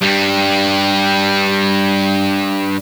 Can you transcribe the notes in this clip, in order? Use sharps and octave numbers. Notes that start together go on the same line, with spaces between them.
G2 G3